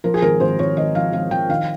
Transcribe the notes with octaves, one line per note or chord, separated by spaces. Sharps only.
F3 A#4
G#4
G#1 A#4
G#1 C5
G#1 C#5
G#1 D#5
F3 F5
G#1 F5
F3 G5
D#3 F5